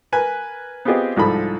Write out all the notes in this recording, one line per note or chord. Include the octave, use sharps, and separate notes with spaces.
A#4 B4 G#5
B3 C4 F4 G4 G#4 D#5
C2 G#2 F3 A4 B5